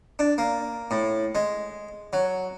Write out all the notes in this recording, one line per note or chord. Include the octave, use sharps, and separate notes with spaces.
D4
A#3
A2
G#3
F#3